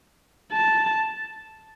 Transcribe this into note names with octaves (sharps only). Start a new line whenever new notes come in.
A5